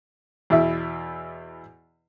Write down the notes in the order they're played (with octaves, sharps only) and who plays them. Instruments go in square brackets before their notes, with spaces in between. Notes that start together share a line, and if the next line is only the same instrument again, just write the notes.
[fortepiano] E2 B2 E4 E5